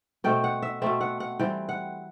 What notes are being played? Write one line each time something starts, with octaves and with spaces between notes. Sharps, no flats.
B2 A3 C4 G5
F#5
E5
B2 A3 C4 E5
F#5
F#5
E3 G3 C4 G5
F#5